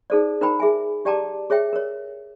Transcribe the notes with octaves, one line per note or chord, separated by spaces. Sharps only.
D#4 G#4 A4 C5 D5
D#4 A#4 C5 G5 A#5 B5
G#4 E5 G#5
G4 D5 G5 A5 A#5 D6
G#4 C#5 E5 G5
A#4 C#5